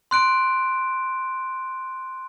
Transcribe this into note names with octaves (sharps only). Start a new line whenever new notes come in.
C6 F#6 D7